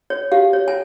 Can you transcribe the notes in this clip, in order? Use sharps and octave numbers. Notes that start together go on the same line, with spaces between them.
C#5
G4 F5
C#5
G#5